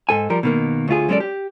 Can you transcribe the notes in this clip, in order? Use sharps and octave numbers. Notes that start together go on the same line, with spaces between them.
G#2 A4 G#5
F3 G3 A#4
B2 D#3 A#3
D2 A3 F4 G#4
F#3 G#3 C#4 G#4 A4 D5
G4